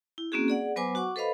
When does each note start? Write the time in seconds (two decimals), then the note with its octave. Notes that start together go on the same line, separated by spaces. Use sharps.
0.18 E4
0.32 A#3 C4 C#4 F#4 G#4
0.48 G#4 D5 F#5
0.76 F#3 B3 B4 C5 G#5 D6
0.95 F#4 F#5 C#6 D6
1.16 A4 B4 C5 D#5 F5 B5